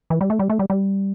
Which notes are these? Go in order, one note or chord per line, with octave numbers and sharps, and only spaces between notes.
E3
G3
A3
G3
A3
G3
G3